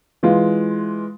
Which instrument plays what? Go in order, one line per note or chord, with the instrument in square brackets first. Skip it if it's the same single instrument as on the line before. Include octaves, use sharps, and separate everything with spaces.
[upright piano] E3 G#3 F4